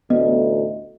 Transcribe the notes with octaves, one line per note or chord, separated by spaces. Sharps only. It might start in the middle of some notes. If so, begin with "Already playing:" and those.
A1 D2 B3 D#5